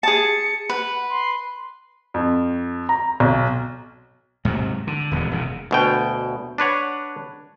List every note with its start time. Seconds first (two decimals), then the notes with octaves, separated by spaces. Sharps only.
0.03 G#4 A5 C#7
0.69 B4 F#5
1.10 C6
2.14 F2
2.89 A#5
3.20 B1
4.45 G#2 C3 D#3 F#3
4.87 D3
5.11 D#1 E2 G#2 C3
5.31 E1 F#2 C3
5.71 D2 B2 G5
6.58 D4 B4 C#5 F#5